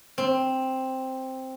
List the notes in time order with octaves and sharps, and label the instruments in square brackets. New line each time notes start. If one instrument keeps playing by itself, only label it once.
[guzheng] C4